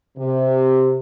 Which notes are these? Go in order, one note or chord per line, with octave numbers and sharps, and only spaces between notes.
C3